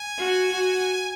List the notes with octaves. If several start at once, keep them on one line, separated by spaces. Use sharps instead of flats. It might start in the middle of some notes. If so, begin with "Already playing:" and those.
Already playing: G#5
F#4
F#4